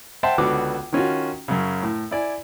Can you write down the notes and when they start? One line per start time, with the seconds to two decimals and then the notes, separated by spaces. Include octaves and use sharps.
0.23 C5 E5 F#5 G5 A5 C6
0.38 C#2 D3 B3 F#4 D6
0.93 D#3 C#4 F4 F#4
1.48 F#2 C#3
1.83 A2
2.11 E4 D5 G#5